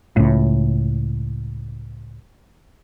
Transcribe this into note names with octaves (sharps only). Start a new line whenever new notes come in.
C#2 A2